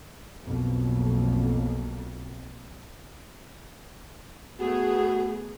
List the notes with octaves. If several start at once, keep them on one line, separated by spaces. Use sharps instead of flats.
B1 F2 B2 A#3
A3 B3 F#4 G#4